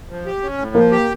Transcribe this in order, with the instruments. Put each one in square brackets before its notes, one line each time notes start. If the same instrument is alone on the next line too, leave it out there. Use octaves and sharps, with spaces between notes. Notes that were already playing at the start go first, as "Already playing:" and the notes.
[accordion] F3
G4
C#4
A2
[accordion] F3 [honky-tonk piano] A#3
[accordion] G4